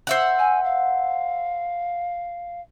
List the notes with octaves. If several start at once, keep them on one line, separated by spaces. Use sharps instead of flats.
C5 E5 F#5
G#5
F5